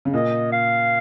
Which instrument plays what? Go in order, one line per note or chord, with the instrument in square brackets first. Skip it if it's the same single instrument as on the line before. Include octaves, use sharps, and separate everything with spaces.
[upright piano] C#3
[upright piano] A#2 [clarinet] D#5
[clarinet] F5